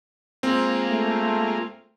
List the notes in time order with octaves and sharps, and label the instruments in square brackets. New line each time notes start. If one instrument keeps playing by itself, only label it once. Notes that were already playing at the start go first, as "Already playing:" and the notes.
[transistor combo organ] G#3 A#3 F4 [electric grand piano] C4
[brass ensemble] A3